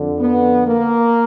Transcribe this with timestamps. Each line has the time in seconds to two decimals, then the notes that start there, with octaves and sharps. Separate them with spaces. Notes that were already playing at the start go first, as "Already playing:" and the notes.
Already playing: F2 D3
0.20 B3
0.66 A#3